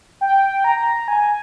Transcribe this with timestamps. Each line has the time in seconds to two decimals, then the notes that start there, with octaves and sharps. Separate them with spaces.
0.21 G5
0.64 A#5
1.08 G#5